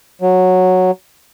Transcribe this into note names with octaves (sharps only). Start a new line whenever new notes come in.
F#3